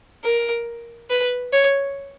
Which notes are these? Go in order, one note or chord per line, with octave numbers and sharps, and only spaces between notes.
A#4
B4
C#5